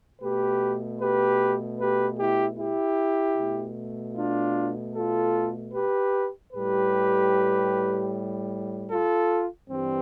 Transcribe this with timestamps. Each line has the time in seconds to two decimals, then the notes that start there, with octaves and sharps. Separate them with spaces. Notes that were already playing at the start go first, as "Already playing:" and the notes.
0.21 B2 A3 G4 B4
1.01 G4 B4
1.80 G4 B4
2.19 E4 G4
2.58 E4 G4
3.38 B2 A3
4.16 D4 F4
4.95 F4 A4
5.74 G4 B4
6.53 A2 G3 G4 B4
8.91 F4 A4
9.69 G2 E3 G3 C4